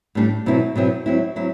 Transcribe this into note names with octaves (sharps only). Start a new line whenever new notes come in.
A2 G3 D4
B2 F#3 C4 E4
B2 F#3 C4 E4
F#3 C4 E4
F#3 C4 E4